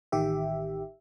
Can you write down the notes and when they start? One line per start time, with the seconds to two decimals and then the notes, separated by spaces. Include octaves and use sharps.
0.12 A1 D#3 G4 E5